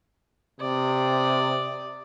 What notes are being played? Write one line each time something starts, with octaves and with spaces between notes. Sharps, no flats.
C3 D5 D#6